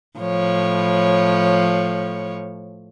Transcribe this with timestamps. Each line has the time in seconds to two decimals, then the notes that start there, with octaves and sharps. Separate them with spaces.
0.19 A2 F3 C#5